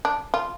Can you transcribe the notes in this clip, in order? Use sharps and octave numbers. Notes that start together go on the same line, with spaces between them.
D4
F4